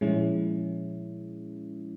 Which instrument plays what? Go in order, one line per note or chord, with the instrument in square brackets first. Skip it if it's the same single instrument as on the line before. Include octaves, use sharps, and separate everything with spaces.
[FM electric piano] A#2 F3 G#3 C#4 E4